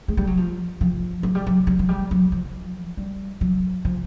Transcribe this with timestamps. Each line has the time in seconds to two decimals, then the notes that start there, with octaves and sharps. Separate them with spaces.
0.08 G#3
0.17 G3
0.27 F#3
0.37 F3
0.81 F3
1.23 F#3
1.35 G3
1.47 F#3
1.67 F#3
1.79 F#3
1.89 G3
2.11 F#3
2.32 F3
2.97 G3
3.41 F#3
3.85 F3